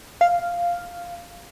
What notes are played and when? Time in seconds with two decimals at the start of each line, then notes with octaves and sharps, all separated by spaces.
0.21 F5